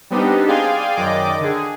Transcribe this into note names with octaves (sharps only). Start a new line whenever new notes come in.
G3 B3 C4 D4 D#4 G4
G#4 D5 F5 G5 G#5 C6
F#2 D#3 D5 D#5 G5 D6
D3 G#4